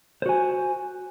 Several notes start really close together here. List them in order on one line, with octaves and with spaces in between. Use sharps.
C5 F#4 G#5